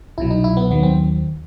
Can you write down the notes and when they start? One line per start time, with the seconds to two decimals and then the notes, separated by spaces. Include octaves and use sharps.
0.18 C2 B2 F#3 E4
0.31 D#4
0.44 E4
0.57 B3
0.70 D#2 D#3 F#3 B3
0.83 C4